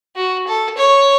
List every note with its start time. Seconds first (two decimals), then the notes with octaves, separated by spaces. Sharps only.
0.16 F#4
0.47 A4
0.77 C#5